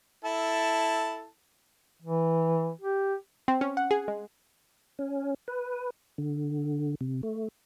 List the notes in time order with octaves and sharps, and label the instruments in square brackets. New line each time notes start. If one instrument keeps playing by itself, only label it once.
[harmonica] E4 A4 A5
[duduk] E3
G4
[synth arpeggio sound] C4
C#4
F#5
G#4
G#3
[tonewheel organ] C#4
B4
D3
C3
A3